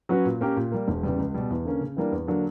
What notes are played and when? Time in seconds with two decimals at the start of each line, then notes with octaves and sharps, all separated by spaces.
0.09 F#3 C#4 F#4 B4
0.25 A#2
0.41 A#3 C#4 G4 A#4
0.56 A#2
0.72 G3 A#3
0.88 E1
1.03 E2 C#3 E3 G3
1.18 C#2
1.34 B2 G3
1.50 E2
1.65 D3 A#3 C#4
1.81 C#3
1.97 E3 G3 A#3 D4
2.12 E2
2.27 D3 F#3 A#3 D4